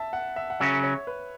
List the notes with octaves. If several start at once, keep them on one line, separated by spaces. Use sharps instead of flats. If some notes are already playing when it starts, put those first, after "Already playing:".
Already playing: E5 A5
F#5
E5
F#5
C#3 F#3 C#4 E5
C#5
B4